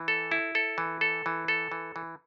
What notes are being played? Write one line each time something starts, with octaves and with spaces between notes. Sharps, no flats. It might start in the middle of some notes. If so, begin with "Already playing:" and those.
Already playing: E3
A4
E4
A4
E3
A4
E3
A4
E3
E3